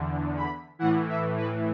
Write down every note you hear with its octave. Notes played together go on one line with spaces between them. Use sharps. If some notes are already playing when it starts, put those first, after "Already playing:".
Already playing: E2 D3
B5
A2 E3 F#5
E5
B4